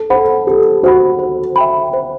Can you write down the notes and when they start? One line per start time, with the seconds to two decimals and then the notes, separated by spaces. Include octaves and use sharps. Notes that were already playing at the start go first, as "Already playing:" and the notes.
Already playing: A4
0.10 A4 C5 F#5 B5
0.47 G4 A4
0.83 F#4 C5 F#5 B5
1.19 C5
1.56 E5 G5 B5
1.93 C5